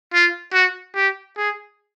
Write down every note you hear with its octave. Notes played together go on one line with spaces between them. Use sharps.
F4
F#4
G4
G#4